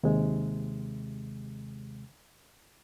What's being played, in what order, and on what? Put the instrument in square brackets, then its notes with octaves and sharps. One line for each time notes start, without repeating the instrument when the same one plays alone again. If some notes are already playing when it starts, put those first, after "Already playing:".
[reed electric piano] D#2 C3 G#3